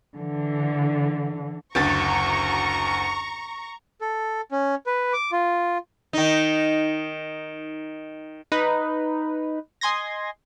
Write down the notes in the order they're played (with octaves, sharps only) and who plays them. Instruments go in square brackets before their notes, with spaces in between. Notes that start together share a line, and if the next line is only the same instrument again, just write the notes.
[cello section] D3 E3
[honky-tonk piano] F#1 D2 A6 [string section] A#5 C#6
[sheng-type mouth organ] A4
C#4
B4
D6
F4
[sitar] D#3 D#4
[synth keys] D#4 B4
D#5 G#5 C6 G#6 A#6